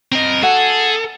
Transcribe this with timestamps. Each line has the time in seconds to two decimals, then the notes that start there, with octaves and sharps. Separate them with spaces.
0.12 C4 A#4 D#5
0.43 F#4 G#4 A4 F#5